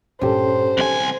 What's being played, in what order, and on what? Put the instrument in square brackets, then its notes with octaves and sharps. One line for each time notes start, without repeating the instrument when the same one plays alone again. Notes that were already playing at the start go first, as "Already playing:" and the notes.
[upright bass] G2 A#2 [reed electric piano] C#4 G4 A4 [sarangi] C5
[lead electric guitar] C2 G#5 [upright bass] D#3